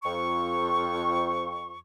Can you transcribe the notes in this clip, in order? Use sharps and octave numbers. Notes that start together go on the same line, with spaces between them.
F2 C#6